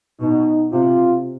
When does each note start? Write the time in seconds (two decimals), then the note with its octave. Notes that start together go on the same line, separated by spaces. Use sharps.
0.21 B2 D#4
0.73 C3 F4